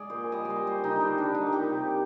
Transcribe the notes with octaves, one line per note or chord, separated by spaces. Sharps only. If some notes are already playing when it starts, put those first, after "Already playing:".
Already playing: G#3 G#4 D5
A#2 C5
G3 D#5
D5
C5
G3
C5
D3
D#4
G3 D4
D4
G3
D#4
A#2
G4
C3